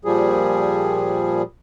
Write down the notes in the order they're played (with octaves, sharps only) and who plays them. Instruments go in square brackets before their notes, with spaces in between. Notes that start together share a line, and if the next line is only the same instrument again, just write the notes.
[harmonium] A#2 F3 G3 G#4